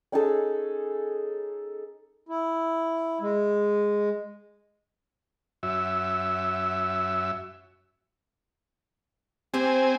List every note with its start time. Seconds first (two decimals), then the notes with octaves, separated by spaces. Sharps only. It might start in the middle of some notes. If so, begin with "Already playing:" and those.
0.12 C#4 D#4 G#4 A4
2.29 E4
3.21 G#3
5.63 F#2 E5
9.54 C4 G4 C5 G#5